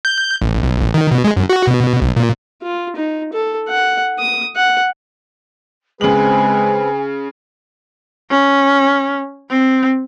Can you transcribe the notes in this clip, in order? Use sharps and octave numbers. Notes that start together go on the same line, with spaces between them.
G6
A1
B1
A1
D#3
B2
G#3
F#2
F#4
B2
B1
A#2
F4
D#4
A4
F#5
D#6
F#5
C#3 G#3 C4 G#4 B4 G#5 F#7
C#4
C4